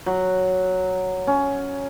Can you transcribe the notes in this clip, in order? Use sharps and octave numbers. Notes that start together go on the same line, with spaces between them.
F#3
C#4